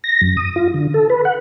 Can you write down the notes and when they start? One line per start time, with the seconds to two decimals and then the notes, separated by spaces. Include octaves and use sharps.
0.04 A#6
0.21 F#2
0.37 D#6
0.56 F4
0.74 D3
0.94 A4
1.10 B4
1.25 F#5